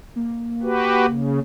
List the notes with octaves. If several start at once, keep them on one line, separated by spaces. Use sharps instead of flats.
A#3
F#4 G4 B4
C#3